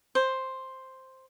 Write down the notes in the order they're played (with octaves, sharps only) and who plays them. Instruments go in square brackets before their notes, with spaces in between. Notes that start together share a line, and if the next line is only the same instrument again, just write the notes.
[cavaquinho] C5